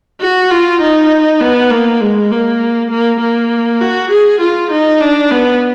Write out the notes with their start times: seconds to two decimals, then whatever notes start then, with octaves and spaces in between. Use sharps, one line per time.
0.21 F#4
0.51 F4
0.81 D#4
1.40 B3
1.70 A#3
2.01 G#3
2.31 A#3
2.91 A#3
3.20 A#3
3.81 F#4
4.11 G#4
4.40 F4
4.71 D#4
5.00 D4
5.31 B3